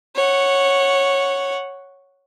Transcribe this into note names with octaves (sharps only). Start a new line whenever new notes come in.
C#5 F#5